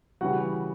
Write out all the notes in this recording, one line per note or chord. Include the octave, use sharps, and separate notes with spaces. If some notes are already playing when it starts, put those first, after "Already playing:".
C#3 E3 G3 F#4 F#5